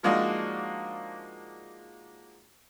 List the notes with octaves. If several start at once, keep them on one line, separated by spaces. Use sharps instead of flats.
F3 G#3 A#3 D4 D#4 F#4